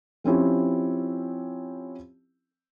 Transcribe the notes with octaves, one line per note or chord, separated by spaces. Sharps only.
F3 C4 C#4 E4 G4